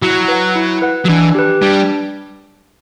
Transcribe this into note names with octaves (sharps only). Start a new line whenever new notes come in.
F#3 E4
B4 F#5
E4
B4 F#5
F#3
E3 D4
G4 B4
G3 D4